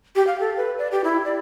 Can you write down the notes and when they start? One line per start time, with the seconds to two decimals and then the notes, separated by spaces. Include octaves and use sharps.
0.16 G4
0.27 F5
0.40 A4
0.57 B4
0.78 D5
0.91 G4
1.04 E4
1.25 D5